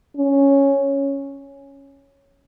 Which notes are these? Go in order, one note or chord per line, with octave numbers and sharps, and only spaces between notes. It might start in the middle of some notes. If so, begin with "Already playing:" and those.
C#4